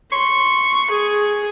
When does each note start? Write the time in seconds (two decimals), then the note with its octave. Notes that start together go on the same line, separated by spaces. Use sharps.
0.12 C6 C#6
0.90 G#4